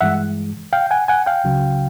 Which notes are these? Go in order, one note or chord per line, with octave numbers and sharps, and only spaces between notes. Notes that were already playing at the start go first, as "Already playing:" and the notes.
G2 E3 G#3 E5 F#5
F5 G5
F#5 G#5
F#5 G#5
F5 G5
C#2 C#3 F#3